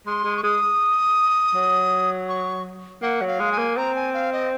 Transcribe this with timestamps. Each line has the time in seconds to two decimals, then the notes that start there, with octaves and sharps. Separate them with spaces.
0.06 G#3 C6
0.24 G#3
0.37 C#6
0.43 G#3 D#6
1.54 F#3
2.29 C#6
3.02 A#3 F#5
3.21 F#3
3.28 F5
3.39 G#3
3.52 G#5
3.58 A#3
3.77 C4 A#5
3.95 G#5
4.14 F5
4.33 D#5